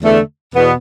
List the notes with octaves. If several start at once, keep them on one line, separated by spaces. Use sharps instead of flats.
E2 D3 A3
E2 B2 B3